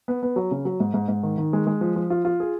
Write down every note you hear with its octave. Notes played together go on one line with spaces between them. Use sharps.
B3
B3
F#3
C#3
F#3
G#2
G#2
G#2
D#3
D#3
G#3
G#3
F3
F3
F4
F4
G#4